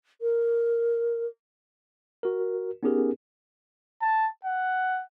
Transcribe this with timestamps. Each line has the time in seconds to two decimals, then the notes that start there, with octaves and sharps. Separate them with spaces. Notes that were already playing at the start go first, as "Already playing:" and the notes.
0.21 A#4
2.23 F#4 A#4
2.83 B3 C#4 D#4 G4 G#4 A#4
4.01 A5
4.45 F#5